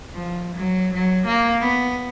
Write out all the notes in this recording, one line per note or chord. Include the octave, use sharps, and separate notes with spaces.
F3
F#3
F#3
A#3
B3